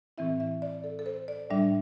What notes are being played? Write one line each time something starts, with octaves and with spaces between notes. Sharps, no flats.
A2 E3 C4 E4 E5
E5
D5
A4
A4
C5
D5
A2 G3 D4 E5